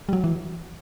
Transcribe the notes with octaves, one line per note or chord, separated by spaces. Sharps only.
G3
F#3
E3